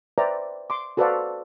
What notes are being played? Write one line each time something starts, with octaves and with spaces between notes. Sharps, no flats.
B4 C5 D5 E5 G5 A#5
C6 D6
F#4 A4 B4 C5 D5 F5